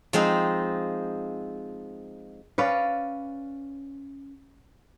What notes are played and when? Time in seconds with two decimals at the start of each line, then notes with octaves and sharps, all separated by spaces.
0.13 F3 G#3 C4 D#4
2.58 C#4 B4 D5 F5